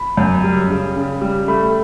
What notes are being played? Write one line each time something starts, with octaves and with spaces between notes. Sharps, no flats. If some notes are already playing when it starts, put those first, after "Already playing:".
Already playing: B5
F#2
G3
C#3
C#3
G3
A3 B5